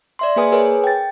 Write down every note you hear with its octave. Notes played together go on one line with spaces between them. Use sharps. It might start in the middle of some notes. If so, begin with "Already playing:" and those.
D5 E5 C6
A#3 G#4 B4 G#5 D#6
G#4 A#4 B4 C#5 G#5
G5 A6